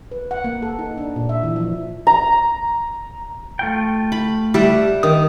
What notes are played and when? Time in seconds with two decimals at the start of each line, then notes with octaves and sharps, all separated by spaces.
0.12 B4
0.31 F#5
0.44 A#3
0.62 A4
0.79 D#4
0.98 D4
1.16 A#2
1.29 E5
1.43 E3
1.56 F3
2.07 A#5
3.59 A3 F4 G5
4.12 B5
4.54 G3 D5 E5 F#5
5.03 D#3 D#6